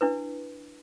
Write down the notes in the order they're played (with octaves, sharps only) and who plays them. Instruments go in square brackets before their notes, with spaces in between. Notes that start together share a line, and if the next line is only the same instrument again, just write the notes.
[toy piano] D4 E4 B4